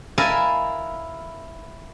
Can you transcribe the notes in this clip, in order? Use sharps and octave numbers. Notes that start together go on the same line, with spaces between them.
E4 A#4 D#5 F5 G#5 A5